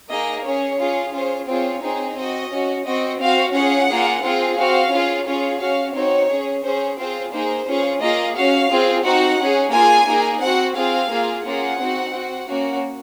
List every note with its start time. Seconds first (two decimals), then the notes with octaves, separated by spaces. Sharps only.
0.10 A#3 D#4 G#4 D#5
0.45 C#4 G#4 C#5
0.79 C#4 F4 G#4
1.13 C#4 F4 G#4 C5
1.48 C4 F4 G#4 C#5
1.82 C4 D#4 G#4
2.16 C4 F#4 D#5
2.51 C#4 F#4
2.85 C4 F#4 D#5
3.19 C4 F#4 F5
3.54 C#4 F4 G#4 F#5
3.88 A#3 F4 G#4
4.23 C4 F4 G#4
4.57 C4 F#4 F5
4.91 C#4 F4 G#4
5.26 C#4 F4 G#4 C#5
5.60 C#4 F#4 F5
5.94 C4 D#4 F#4 C#5
6.29 C#4 G#4
6.63 C#4 G#4 C5
6.98 C4 F4 G#4 C5
7.32 A#3 D#4 G#4 C5
7.67 C#4 F4 G#4
8.01 A#3 F4 G#4 D#5
8.35 C#4 F#4 F5
8.70 C4 F4 G#4
9.04 C4 D#4 F#4 F#5
9.39 C#4 G#4
9.73 A#3 F4 G#4 G#5
10.07 A#3 D#4 G#4
10.41 C4 F#4 F#5
10.76 C4 F4 G#4 F5
11.10 A#3 F4 G#4
11.45 A#3 C#4 F4 G#4 F#5
11.79 C4 D#4 F#4
12.14 C4 F#4
12.48 A#3 C#4 F#4